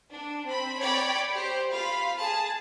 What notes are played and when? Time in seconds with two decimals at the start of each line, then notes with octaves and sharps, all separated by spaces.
0.11 D4
0.47 C4 B5
0.80 C#5 D5 G5 B5
1.34 G4 C5
1.71 F4 F5 B5
2.18 G#4 A5